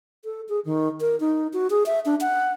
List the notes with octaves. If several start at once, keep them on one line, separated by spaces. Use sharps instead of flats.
A4
G#4
D#3
A#4
D#4
F#4
G#4
E5
D4
F#5